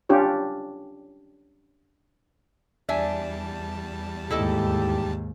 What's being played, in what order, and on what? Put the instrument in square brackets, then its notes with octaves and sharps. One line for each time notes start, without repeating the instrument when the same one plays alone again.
[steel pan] C#4 D4 F4 G4 C#5
[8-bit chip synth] E2 G3 A5 [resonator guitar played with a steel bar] D4 E5 G#5
[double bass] D#2 G#2 [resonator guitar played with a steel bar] E4 A4 D#5 [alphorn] G4